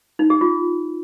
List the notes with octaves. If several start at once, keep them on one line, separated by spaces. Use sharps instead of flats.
D#4
G4
F4